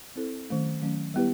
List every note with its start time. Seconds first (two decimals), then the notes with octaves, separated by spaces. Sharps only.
0.16 C4 E4 A4 C5
0.49 D#3 F#3 A3 C#4
0.82 D#3 F#3 A3 C#4
1.14 G3 B3 E4 G4 B4